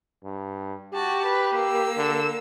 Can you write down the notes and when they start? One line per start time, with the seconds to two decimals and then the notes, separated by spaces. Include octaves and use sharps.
0.24 G2
0.94 F#4 G4 A5
1.25 B4
1.55 A#3 E6
1.97 D3